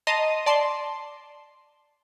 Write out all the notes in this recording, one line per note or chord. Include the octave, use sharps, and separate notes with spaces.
D#5 A5 A#5 C6 D#6
D5 A5 C6